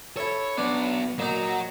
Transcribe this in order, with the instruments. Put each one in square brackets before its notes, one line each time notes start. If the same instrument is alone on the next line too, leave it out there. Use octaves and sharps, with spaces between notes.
[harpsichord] E4 A4 [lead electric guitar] C#5
[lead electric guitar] F#3 B3 [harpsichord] D4
[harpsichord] A#2 D#4 A#5 [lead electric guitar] F#3 F#4